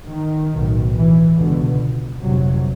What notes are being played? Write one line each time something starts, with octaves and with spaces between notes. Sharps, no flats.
D#3
B1 A2
E3
C#2 B2 D3
G1 F2 C3 F#3